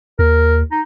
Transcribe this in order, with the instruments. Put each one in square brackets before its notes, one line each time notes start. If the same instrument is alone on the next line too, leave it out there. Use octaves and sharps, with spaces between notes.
[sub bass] D#2 [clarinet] A#4
[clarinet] D#4